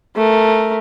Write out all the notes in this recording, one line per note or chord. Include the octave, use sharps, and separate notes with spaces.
A3 A#4